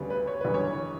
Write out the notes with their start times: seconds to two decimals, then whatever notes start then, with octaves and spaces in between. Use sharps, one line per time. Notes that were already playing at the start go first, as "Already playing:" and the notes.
Already playing: D2 C#3 G3 B3
0.10 B4
0.27 C#5
0.41 F#1 E2 D3 G3 B4
0.54 C#5